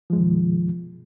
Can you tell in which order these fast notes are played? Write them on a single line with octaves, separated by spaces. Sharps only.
F3 G#3 F#2 D#3 B2